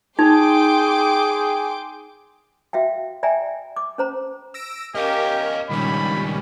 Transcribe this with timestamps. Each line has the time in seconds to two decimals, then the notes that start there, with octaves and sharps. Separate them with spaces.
0.19 D#4 G#4 G5 C6 D6
2.73 F#4 E5 F5 G5
3.23 D5 E5 G5 G#5 A#5
3.76 D6
3.98 C#4 C5 A#5
4.54 E6 A#6 D7
4.95 C#4 G4 A#4 D#5 F5
5.70 C#2 A#2 D#3 G3 C#4 B5